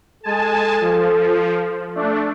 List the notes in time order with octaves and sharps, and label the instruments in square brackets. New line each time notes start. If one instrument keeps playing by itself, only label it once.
[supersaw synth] G#3 G#5 A5 [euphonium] A4
[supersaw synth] F3
A3 D4